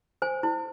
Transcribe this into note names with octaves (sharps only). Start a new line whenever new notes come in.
C5 G#5
E4